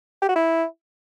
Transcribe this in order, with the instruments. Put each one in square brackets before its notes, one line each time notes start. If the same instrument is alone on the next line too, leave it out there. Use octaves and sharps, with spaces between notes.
[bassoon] G4
F#4
E4